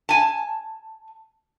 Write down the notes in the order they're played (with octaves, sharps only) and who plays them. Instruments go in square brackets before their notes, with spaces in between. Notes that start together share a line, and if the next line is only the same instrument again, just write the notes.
[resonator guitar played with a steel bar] G#5 A5